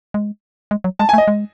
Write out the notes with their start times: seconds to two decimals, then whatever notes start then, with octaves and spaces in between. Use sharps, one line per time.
0.14 G#3
0.71 G#3
0.84 F#3
0.99 G#3 A5
1.09 G#5
1.13 A3
1.18 D#5
1.28 G#3